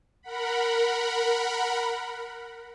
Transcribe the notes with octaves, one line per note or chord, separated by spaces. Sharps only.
A#4 F#5 B5